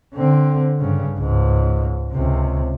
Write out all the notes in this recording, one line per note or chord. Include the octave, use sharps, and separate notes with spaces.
D3 C4
G2 C#3
C#2 G#2
C#2 C3